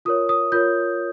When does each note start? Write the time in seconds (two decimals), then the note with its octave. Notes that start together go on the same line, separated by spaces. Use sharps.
0.05 F4 A#4 C#5 D#6
0.29 D#6
0.52 F4 A#4 C#5 G6